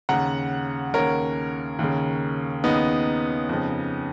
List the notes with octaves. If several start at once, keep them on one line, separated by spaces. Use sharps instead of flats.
D#2 C#3 F#5 A#5
D#2 C#3 A#4 C#5
D#2 C#3
D#2 C#3 B3 D#4
F2 C#3